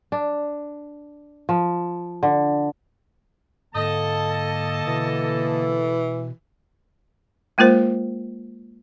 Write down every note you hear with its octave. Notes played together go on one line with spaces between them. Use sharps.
D4
F3
D3
G#2 D3 A#3 A4 D#5 A5
B2 E3
G#3 A#3 F4 A#4 C5